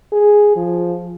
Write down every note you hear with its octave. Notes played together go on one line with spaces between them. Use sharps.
G#4
F3